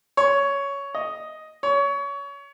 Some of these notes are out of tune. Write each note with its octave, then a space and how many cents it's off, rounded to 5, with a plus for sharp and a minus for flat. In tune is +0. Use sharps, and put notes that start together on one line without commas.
C#5 +10
D#5 +5
C#5 +25